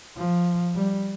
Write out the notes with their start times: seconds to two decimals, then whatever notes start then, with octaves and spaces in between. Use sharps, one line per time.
0.17 F3
0.75 G3